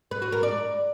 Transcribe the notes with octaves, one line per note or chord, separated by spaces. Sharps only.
B4
F#4
A#4
D5